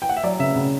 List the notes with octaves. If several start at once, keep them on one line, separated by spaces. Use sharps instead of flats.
G5
F#5
E5
F#3 D5
C#3 E5
C#3